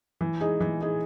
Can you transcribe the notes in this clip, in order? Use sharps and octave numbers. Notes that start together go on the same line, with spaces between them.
E3
G#3 D#4 G#4
E3
G#3 D#4 G#4